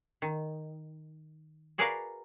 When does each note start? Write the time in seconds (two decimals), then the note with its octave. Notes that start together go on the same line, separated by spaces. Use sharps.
0.22 D#3
1.78 F#4 G#4 A#4 B4 D5 F5